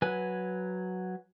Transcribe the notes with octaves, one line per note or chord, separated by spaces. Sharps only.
F#3 B4 G#5